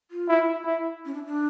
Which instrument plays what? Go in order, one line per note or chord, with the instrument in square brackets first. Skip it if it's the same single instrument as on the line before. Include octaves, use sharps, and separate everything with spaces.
[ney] F4
[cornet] E4
E4
[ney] C#4
D4
D4